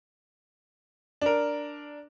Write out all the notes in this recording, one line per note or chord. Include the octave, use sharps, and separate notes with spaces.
D4 A#4